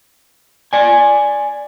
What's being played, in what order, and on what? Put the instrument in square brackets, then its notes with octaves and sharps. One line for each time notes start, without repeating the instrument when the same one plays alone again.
[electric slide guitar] D5 G#5